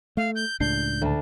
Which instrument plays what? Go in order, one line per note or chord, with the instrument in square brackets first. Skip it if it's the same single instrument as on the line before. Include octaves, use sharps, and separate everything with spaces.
[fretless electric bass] A3 [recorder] F5
[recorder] G6
[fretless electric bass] C#2 A2 D4 [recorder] G6 [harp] C7
[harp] D2 A5